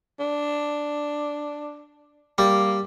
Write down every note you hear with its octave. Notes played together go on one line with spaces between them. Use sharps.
D4
G3 A#3